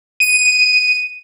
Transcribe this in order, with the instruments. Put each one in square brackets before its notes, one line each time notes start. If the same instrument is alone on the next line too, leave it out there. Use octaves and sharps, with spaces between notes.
[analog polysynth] D#7